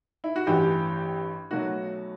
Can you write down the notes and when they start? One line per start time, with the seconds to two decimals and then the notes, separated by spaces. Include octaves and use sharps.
0.24 E4
0.36 F#4
0.46 A1 G2 E3 G4
1.51 B1 B2 F#3 A3 F#4